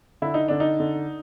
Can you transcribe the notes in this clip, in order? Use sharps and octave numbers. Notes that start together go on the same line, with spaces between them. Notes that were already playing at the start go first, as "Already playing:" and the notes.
D3 E4
D#4
D3 D4
D#4
D3